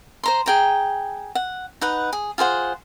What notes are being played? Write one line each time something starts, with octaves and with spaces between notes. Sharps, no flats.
C5 A#5 C6
G#4 G5 A#5
F#5
D#4 B4 F#5
G#4
F4 G#4 C5 F#5